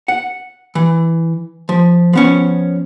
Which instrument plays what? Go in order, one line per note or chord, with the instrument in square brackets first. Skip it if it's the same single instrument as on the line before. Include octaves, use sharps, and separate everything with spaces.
[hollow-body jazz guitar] F#5
E3
F3
F3 B3 C#4